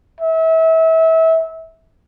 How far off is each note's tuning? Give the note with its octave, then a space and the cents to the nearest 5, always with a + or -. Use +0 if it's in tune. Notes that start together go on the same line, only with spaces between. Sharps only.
E5 -30